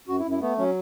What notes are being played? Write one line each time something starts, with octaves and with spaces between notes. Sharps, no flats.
F#2 F#4
E4
F#2
E4
A3 B3
F#3 C#4